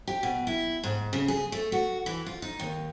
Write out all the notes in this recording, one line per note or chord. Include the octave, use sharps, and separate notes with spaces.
G4
B2
E4
G#2
C#3
G#4
A3
F#4
E3
F4
D#4
D#2